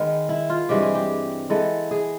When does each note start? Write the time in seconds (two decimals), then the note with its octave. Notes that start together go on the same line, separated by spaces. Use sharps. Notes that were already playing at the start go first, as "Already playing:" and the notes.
Already playing: D#3 G#3 B3 D#4
0.29 E4
0.50 F4
0.69 G2 E3 G#3 C4 G4
0.82 G#4
0.95 G4
1.50 E3 G#3 B3 A4
1.91 G#4